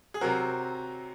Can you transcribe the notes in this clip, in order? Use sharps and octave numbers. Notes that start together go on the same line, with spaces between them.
G#4
C3 F#3 C4 F#4 A#4